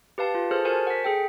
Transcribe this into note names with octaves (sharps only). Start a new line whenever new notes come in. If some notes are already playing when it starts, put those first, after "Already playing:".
G4 B4 F5 A5
F4
G#4 A4 C5 A5 F6
F#4 A#4 C5 G#5 A5
F#5 B6
G#4 A4 G5